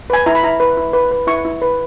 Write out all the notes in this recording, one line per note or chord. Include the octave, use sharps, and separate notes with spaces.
B4 G#5
E4 A#5
B5
E4 A#5
B4
E4
B4
B4
E4 C#6
E4
B4